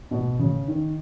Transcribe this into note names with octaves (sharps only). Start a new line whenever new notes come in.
B2
C#3
D#3